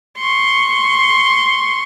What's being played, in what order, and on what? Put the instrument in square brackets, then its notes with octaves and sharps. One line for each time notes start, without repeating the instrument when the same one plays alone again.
[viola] C6 C#6